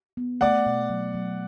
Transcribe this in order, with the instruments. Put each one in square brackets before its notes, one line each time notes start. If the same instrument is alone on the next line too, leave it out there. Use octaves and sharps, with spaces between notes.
[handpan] B3
[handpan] A3 [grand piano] D5 F#5
[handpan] B2
F#3
F#3